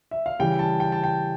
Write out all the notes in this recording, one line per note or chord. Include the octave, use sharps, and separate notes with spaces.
E5
F5
C#3 E3 G3 G5
A5
G5
A5
G5